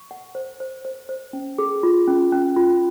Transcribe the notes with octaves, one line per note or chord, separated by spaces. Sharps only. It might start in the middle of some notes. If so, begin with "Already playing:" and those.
Already playing: C#6
F#5
C5
C5
C5
C5
C#4
G#4
F4
C#4
C#4
F4